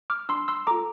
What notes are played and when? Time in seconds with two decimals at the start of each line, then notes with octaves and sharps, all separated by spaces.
0.10 D6 F6
0.29 D4 C6 E6
0.48 C6 E6
0.67 F4 A4 A#5 D6